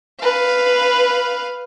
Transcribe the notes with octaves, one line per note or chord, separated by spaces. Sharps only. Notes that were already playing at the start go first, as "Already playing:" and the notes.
B4 F5